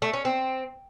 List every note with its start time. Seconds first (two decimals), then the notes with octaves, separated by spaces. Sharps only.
0.02 A3
0.13 C#4
0.25 C4